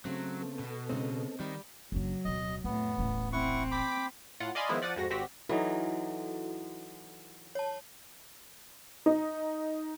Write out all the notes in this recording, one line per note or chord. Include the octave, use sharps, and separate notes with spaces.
C#3 F#3 A3 C4
B3 A4
B2
C#3 G#3 C4 D#4
D#3 G3
F#1 F#3 D4
D1 B2 D#5
F2 A2 B3
D#1 A1
C4 E4 F#5 C#6
G5 B5 D6
A2 F4 F#5
D5 D#5 F5 G#5 B5 C6
D#3 F3 G#3 B3 E4
F3 D5 F#5 A6 D#7
F2 G#2 F#4 A#6
G#1 C4 F#4 G4 A#6 B6
E3 F#3 D#4 E4 F#4 A4
C#5 A5
D#4